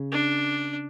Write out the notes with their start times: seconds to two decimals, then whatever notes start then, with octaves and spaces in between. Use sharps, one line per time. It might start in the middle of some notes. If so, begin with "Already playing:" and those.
Already playing: C#3
0.12 D4